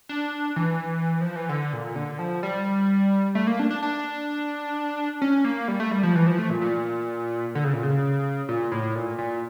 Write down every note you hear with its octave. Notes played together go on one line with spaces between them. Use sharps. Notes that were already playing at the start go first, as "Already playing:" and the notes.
D4
E3
F3
E3
D3
A#2
D3
F3
G3
A3
A#3
D4
D4
D4
C#4
A#3
G3
A3
G3
F3
E3
F3
A3
A#2
A#2
D3
C#3
A#2
C#3
A#2
A2
A#2
A#2